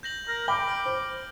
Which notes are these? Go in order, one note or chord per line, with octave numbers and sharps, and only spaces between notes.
G6 A#6 F#7
A#4
G5 B5 D6 G7
F6
C5